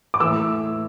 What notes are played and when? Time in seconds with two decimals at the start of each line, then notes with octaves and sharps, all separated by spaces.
0.14 D6
0.20 A2 E3 E6